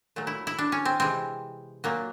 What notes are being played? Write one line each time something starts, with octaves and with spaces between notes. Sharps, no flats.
A#2 F#3 A3
E4
E4
D4
C#4
C4
C3 E3 G#3 C4
A#2 F#3 A#3